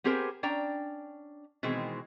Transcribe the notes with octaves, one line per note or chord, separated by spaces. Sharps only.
B3 C4 G4 G#4 A#4 C5
C#4 D4 G5 A#5
B2 D#3 E3 G#3 C4